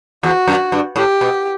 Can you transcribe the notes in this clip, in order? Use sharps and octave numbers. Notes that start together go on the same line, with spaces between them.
E2 F#4
F#2
G2
A2 G4
B2